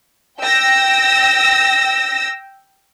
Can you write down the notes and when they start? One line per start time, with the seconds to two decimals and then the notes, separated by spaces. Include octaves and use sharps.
0.40 G5 E6 A#6